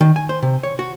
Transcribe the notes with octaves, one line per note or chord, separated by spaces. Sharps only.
D#3
G#5
C5
C3
C#5
F#4